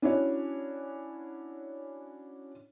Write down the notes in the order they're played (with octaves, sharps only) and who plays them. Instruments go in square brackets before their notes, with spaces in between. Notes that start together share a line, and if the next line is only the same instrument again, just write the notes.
[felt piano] C#4 D4 E4 F#4 C#5